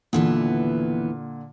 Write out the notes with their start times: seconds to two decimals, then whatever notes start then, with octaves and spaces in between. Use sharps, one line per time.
0.13 D#2 A#2 D3 E3 B3